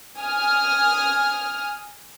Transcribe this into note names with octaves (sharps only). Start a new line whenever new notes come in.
G#5 D#6 F6